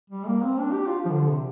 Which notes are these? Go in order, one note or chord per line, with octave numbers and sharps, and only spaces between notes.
G3
A#3
C4
D4
G4
F4
F3
D3
C3